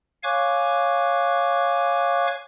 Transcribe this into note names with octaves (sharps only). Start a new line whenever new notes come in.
C#5 F5 G#5 C#6 D6 F#6